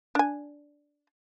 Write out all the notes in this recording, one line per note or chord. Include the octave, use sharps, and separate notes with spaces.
D4 G#5